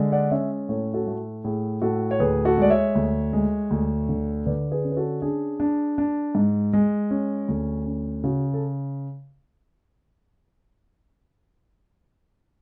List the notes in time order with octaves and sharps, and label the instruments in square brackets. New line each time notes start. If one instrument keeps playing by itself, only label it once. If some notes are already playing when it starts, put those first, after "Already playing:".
Already playing: [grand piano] D3 G#3
D5 F#5
C#4 C#5 E5
A2 A4 C#5
F#4 A4
A3
A2 G#4
A2 F#4 A4
C#5
D2 G#4 B4
F#4 A4
G#3 D5
C#5 E5
D2
G#3
D2
D3
D3 B4 D5
G#4 B4
C#4
B4
F#4 A4
D4 G#4
D4
D4
G#2
G#3
C#4
D2
C#4
C#3 F#4
A4